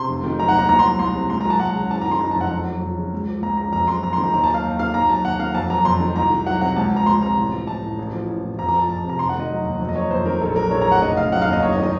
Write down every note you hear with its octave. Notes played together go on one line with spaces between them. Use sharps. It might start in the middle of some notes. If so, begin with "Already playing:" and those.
Already playing: C3 C6
F1
D#3
F#3 A#5
F#5
D#2 A#5
C2 A#5
C6
F#3
C2 C6
C3
C#2 C6
A#5
F#3 A5
C#2 F#5
C#3
F#1 A5
D#3 A#5
C6
F#3 A#5
A5
F2 F#5
F2
F#3
F2
C#3
C#2
F3
C#2 A#5
C#3 A#5
F2 A#5
F#3 C6
F2 A#5
C6
D#3
A#5
D#2 A#5
A5
F#3
F5
D#2
D#3 F5
D#2 A#5
F#3 A5
D#2 F#5
D#3 F5
F2 A5
F#3 A#5
F2 C6
D#3
C2 A#5
D#3
F#3 F#5
C3 F#5
C#2 A5
F3
A#5
C#2 C6
C3 A#5
A1
F3
A1 A5
A2
A1
F3
A1
A2
F2 A#5
A#5
F3 A5
F2 A5
C3
A#5
F1 C6
F#5
D#3 D#5
F#3
D#2
F2
D#5
F#3 C#5
F2 C5
D#3 A#4
A#1 A4
F#3 A#4
A#1 C#5
A#5
A2 F#5
F1 D#5
C#3 F5
F#3 F#5
F5
D#2
D#5
F#1 C#5
D#5
D#3
D#5